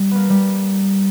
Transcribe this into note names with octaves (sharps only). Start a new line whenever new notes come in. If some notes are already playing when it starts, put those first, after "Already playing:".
Already playing: G3
A#3 B3
G3